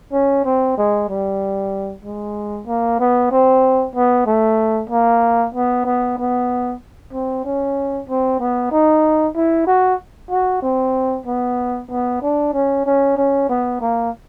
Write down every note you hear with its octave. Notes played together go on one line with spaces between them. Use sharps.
C#4
C4
G#3
G3
G#3
A#3
B3
C4
B3
A3
A#3
B3
B3
B3
C4
C#4
C4
B3
D#4
E4
F#4
F#4
C4
B3
B3
D4
C#4
C#4
C#4
B3
A#3